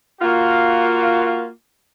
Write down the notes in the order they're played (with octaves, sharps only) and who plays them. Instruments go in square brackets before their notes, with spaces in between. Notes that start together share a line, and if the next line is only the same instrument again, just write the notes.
[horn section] A#3 F4 F#4